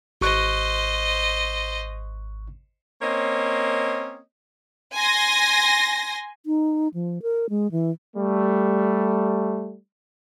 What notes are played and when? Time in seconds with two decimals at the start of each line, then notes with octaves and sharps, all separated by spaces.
0.21 G#1 C5 D#5 C#6 F#6
3.02 A#3 C4 C#4 C#5 D#5
4.94 G#5 C6 A#6
6.46 D#4
6.94 F3
7.22 A#4
7.50 G#3
7.72 E3
8.16 G3 A3